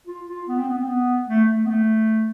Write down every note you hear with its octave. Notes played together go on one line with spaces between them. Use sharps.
F4
F4
B3
C4
B3
C4
B3
A3
A3
B3
A3